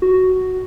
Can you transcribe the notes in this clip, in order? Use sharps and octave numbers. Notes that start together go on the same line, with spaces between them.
F#4